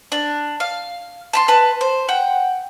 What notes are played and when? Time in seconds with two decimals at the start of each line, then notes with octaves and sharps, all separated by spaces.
0.12 D4
0.60 F5
1.33 A5 B5 C6
1.48 B4 A5
1.81 C5
2.09 F#5 G5